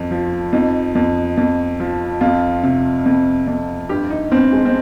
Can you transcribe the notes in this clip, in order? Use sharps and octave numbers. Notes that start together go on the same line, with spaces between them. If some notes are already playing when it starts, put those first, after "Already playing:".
Already playing: F2
F3
F2 D#4
F2
F2
F3
F2 F4
C3
F2
F2
G2 G4
D#4
G2 C4
G#3
C4